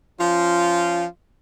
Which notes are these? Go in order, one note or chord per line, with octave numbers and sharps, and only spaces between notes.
F3 C#4 F4